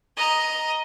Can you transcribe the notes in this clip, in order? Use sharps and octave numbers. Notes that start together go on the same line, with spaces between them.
D#5 A#5